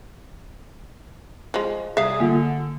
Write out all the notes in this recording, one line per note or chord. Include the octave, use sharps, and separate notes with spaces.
F3 G#3
C3 G3 G#4 E5 F5
D3 A#3 F4